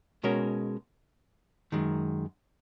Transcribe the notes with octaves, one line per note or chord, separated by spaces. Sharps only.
B2 G#3 C#4 F#4 A#4
F#2 D#3 G#3